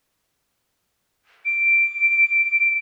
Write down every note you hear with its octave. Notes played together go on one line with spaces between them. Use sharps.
D7